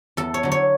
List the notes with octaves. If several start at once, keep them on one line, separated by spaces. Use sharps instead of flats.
E2 A4
C#5
D3 F#3
C#5